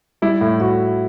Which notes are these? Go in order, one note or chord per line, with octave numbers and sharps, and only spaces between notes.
G3 E4
A2
A2 F#4